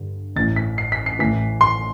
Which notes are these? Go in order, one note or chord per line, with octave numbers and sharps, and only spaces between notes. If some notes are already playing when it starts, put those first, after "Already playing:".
Already playing: G2 D3
A1 A2 E3 A6
B6
C7
B6
C7
A1 A2 E3 B6
C6